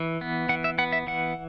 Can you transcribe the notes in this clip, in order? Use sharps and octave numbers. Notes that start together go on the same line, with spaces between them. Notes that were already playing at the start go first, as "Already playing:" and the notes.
Already playing: E3
B3
E3 F#5
E5
B3 F#5
E5
E3 F#5